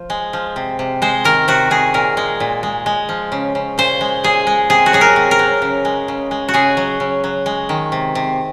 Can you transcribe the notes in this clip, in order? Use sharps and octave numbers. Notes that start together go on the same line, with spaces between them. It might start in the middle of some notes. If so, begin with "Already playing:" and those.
Already playing: F3
G#3
F3
C3
C3
G#3 C5
D#3 A#4
C3 F#4
C3 G#4
A#2 A#4
G#3
A#2
G#3
G#3
F3
C#3
C#3
A#2 C5
G#3
A#2 G#4
G#3
C3 G#4
F#4
F#3 G#4
A#4
C3
A#4
F#3
C#3
G#3
C#3
G#3
F#4
C#3 G#4
F#3
C#3
F#3
G#3
D#3
C3
C3